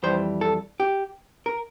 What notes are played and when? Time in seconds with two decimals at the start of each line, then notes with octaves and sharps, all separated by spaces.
0.03 F2 E3 G3 C5
0.41 A4
0.80 G4
1.46 A#4